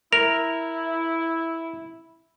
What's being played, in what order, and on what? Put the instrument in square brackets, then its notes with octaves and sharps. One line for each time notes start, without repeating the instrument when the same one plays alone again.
[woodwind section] E4 [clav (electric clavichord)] A#4 [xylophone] F7